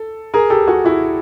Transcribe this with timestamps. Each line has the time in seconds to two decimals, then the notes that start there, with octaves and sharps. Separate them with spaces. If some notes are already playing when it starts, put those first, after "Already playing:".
Already playing: A4
0.34 G#4 A#4
0.50 G4 A4
0.67 F#4 G#4
0.85 E4 F#4